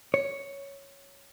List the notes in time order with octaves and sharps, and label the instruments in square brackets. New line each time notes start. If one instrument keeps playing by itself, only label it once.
[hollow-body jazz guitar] C#5